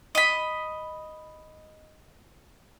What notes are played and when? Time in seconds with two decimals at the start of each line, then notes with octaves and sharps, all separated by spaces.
0.15 D#5 B5